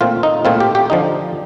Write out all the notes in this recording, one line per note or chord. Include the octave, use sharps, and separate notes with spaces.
A#2 A3 C4 F4
D#4
A#2 A3 C4 F4
G4
G4
D3 F3 D#4